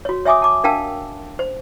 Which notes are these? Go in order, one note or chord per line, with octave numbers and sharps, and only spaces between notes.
F#4 C#5
C#5 E5 G#5 D6 D#6
A5 D6
D4 A#4 F5 G5 A5 E6
C5